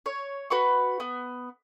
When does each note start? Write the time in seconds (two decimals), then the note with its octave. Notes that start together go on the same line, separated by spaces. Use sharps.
0.06 C#5
0.50 F#4 B4 B5 C#6
1.00 B3